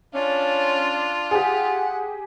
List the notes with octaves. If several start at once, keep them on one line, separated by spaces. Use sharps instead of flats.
C#4 D4 F4
G4 G#4 F#5